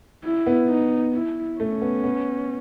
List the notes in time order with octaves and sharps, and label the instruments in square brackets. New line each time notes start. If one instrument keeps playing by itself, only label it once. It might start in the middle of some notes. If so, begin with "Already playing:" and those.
[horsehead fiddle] E4
[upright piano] B3
[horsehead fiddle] D#4
E4
[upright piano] A3 [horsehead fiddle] C#4
[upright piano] B3
B3